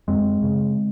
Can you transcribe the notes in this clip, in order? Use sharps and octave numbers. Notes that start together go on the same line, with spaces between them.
F#2 G#3 C4
C#3